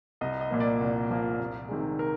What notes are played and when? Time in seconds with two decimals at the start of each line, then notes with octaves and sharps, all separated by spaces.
0.21 C2 D#5
0.41 D#5
0.51 A#2 F3 A#3
0.60 D5
0.81 C2
1.10 A#2 F3 A#3
1.39 C2
1.69 C3 D#3 G#3
1.99 A#4